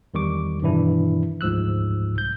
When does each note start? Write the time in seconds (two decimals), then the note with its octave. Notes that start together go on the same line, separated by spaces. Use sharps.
0.14 E2 D#3 G3 C#6 D6
0.62 G2 B2 D#3 E3 D4 E4
1.41 D2 G#2 F3 E6 F#6
2.16 C2 G6